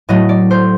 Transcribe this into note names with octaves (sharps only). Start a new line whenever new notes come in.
A2 F#3 A3 D#5
D5
C5